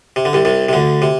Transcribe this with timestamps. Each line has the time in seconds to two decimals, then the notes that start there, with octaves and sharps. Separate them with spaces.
0.16 C3
0.25 D3
0.33 C2 C3
0.45 C2 C3
0.69 C3
0.73 D2 D3
1.02 C3